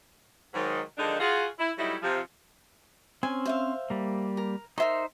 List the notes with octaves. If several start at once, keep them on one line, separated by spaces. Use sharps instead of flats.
G#2 D#3 F#3
D3 D#3 F3 G#3 D4 D#4
F4 F#4 G#4
E4
F#3 G3 A3 D#4 E4
C3 F3
C4 C#4 G#5
C5 E5 F5
G3 A#3
A#4
D#4 A#4 C5 E5 C6